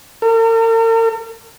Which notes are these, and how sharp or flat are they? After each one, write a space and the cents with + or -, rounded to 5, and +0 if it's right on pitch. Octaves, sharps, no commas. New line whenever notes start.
A#4 -45